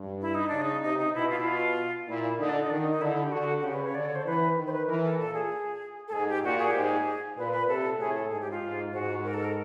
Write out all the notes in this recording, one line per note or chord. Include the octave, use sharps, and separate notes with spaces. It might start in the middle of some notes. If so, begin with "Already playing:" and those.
Already playing: G2
E4
D#4
C#3 D4
D#4
C3 D#4
D#4
B2 E4
F4
E4
F4
A#2 E4
D3 D#4
D4
D#4
D#3 D4
D#4
D#4
D3 E4
G4
D3 F#4
F#4
C#3 G4
B4
C#5
D3 D5
C#5
C5
E3 B4
D#3
C5
B4
E3 A#4
A4
A#2 A4
G#4
A4
G#2 G#4
G4
A#2 F#4
G#4
G#2 G4
G#4
A#2 B4
B4
C3 A4
A2 G#4
A4
G#2 G#4
G4
F4
G#2
G#2 F#4
A#4
A4
A#4